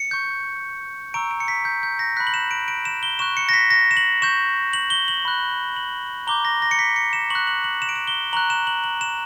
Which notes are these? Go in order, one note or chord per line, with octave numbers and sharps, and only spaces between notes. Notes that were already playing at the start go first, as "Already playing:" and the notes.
Already playing: C#7
C#6 G6
A#5 C#6 E6 D7
D7
C#7
B6
G6
G6
A#6
B5 F#6 B6
F#7
E7
D7
D7
E7
G7
C#6 F#6 E7
C#7
A#6
B6
A#6
E7
F#7
C#6 G6 E7
F#7
G7
F#7
B5 F#6
F#7
A#5 D6 G6 G7
A#6
A#6
C#7
B6
C#7
E7
C#6 F#6 F#7
F#7
F#7
E7
D7
E7
G7
A#5 C#6 F#6 F#7
E7
F#7
F#7
E7